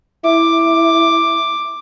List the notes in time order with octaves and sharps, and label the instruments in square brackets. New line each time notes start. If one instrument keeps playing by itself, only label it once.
[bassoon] E4 [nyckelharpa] D6